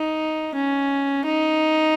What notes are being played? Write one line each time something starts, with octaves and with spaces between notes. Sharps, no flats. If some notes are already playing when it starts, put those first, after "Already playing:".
Already playing: D#4
C#4
D#4